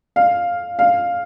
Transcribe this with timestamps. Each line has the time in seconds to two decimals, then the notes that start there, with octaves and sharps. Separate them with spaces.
0.16 F5
0.79 F5